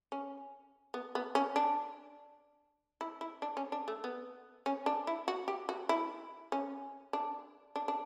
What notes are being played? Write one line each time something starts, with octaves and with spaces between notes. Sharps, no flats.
C#4
B3
B3
C#4
D4
E4
E4
D4
C#4
D4
A3
B3
C#4
D4
E4
F#4
G4
F#4
E4
C#4
D4
D4
D4